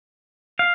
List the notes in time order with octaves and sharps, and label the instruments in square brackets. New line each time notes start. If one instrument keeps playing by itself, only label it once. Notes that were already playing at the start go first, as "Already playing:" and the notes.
[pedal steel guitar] F5